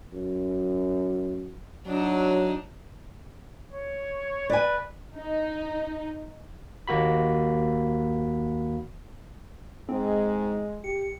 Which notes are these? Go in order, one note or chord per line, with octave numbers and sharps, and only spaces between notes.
F#2
F#3 D4 D#4
C#5
B4 D5 G#5
D#4
D#2 A#3 F#4 B5
G#2 G#3 C4
G4 C#7